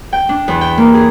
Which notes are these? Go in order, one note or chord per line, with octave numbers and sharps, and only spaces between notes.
G5
D4
E2
G5
A#3
G#4